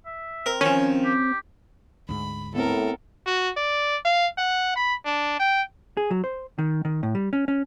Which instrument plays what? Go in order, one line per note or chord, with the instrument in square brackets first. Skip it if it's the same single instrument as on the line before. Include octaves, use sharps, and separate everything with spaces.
[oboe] E5
[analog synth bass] C4 [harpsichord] A#4
[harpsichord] D#3 F3 [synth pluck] C#4 [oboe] G#5
[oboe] G4
[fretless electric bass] D2 G#2 [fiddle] B5
[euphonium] A2 [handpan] A3 B3 C4 [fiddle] A4 A#4
[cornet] F#4
D5
F5
F#5
B5
D4
G5
[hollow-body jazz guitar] G#4
F#3
C5
D#3
D#3
A2
G3
C#4
C#4